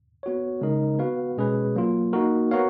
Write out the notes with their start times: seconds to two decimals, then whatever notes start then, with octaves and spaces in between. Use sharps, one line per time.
0.23 B3 F#4 C#5
0.61 C#3 G#3 D#4 A#4 D#5
0.99 B3 F#4 B4 F5
1.38 B2 G#3 C#4 G#4 B4
1.76 F#3 A#3 F4
2.13 A#3 D#4 F#4 A#4
2.51 B3 F#4 A#4 C#5 F5